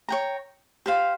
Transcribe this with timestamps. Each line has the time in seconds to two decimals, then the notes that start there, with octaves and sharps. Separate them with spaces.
0.09 C#5 G5 A#5
0.86 G4 C5 F5